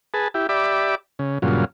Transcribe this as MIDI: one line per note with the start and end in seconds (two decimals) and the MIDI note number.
0.14 0.28 68
0.14 0.28 71
0.14 0.28 81
0.34 0.47 64
0.34 0.47 67
0.49 0.95 67
0.49 0.95 74
0.49 0.95 76
0.49 0.95 83
0.49 0.95 86
1.19 1.38 49
1.42 1.65 43
1.42 1.65 46
1.42 1.65 49
1.42 1.65 54
1.42 1.65 65